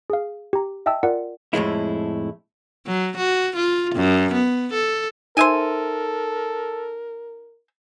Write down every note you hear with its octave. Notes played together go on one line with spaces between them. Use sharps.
G#4 F5
G4 A#5
D#5 E5 G5 A5 E6
F4 A#4 D5 F#5
F2 A2 G#3 E4
F#3
F#4
F4
F#2
B3
A4
D#4 A4 A#4 C5 E5 G#5 D#7